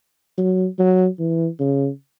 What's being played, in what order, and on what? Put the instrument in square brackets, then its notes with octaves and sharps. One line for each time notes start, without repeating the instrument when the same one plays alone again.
[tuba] F#3
F#3
E3
C#3